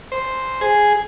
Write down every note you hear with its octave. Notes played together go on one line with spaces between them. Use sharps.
C5
G#4